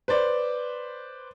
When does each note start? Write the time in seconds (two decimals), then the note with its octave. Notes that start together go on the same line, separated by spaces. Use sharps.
0.08 B4 C5 D5